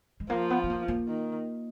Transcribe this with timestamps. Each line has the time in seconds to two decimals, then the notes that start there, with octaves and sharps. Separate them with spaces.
0.20 G#3
0.30 F3 A#3
0.50 B3
0.64 B3
0.70 A#3
0.88 A#3
1.08 D#3